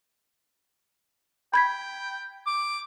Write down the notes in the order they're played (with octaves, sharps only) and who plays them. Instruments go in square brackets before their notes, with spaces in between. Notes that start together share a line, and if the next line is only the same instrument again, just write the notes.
[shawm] G5 [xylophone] B5 G#6 B6
[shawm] D6